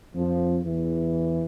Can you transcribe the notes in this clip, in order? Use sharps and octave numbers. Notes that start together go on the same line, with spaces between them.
F2 F3
E2 E3